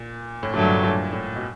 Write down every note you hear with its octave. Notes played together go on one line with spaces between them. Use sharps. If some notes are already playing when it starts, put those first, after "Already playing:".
Already playing: A#2
A2
G2 A#2 D3 F#3 A3
A2
A#2
A2
B2